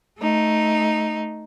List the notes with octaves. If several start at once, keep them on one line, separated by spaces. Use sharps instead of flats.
A3 D#4